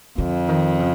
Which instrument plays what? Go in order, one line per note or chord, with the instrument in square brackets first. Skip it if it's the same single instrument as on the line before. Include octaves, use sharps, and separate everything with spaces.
[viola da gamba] F2 [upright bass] D3
[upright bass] D#3
C#3